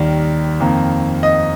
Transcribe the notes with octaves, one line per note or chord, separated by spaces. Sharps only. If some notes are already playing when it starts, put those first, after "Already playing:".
Already playing: D#2 D#3 G3 D5
F2 D#3 A#3
D#5